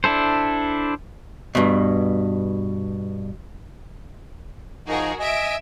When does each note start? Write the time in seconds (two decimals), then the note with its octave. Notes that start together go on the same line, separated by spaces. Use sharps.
0.04 D4 E4 A4 C5
1.55 G2 B2
4.88 F3 D#4 F#4 G#4 A#4
5.20 D#5 E5 G#5 D7